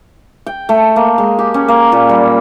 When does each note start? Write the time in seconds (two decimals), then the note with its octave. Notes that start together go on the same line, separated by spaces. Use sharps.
0.46 G5
0.69 A3
0.96 A#3
1.18 G#3
1.39 G4
1.54 C#4
1.68 A#3
1.92 A#2
2.09 G3